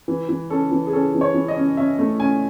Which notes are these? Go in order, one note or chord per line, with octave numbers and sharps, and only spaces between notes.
E3
E3
C#4 A4
E3
G#4
C#4 A4
E3
C#5
E3
D#5
C#4
C#4 E5
A3
C#4 G#5